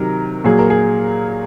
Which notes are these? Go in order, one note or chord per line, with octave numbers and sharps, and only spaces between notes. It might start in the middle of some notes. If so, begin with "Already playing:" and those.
Already playing: C3 D#3 F#3 A#4
A#2 F#3 G#4
A#4
G#4